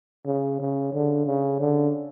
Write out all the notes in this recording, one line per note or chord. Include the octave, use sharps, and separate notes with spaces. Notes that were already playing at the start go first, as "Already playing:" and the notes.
C#3
C#3
D3
C#3
D3